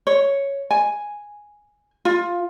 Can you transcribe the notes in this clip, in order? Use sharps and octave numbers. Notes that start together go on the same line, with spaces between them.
C#5
G#5
F4